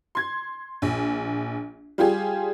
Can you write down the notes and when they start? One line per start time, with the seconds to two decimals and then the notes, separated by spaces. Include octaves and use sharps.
0.15 C6 G#6
0.82 A#1
1.98 G3 F4 G4 G#4